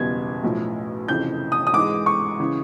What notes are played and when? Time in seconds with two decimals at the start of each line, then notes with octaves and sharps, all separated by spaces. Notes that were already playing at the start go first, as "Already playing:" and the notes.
Already playing: F#1 E2 B2 G3 G#6
0.43 B1 A2 F3
1.08 F1 F2 C#3 E3 G6
1.52 D#6
1.67 D#6
1.73 G#2 E3 G#3 D6
2.06 C#6
2.39 C#3 E3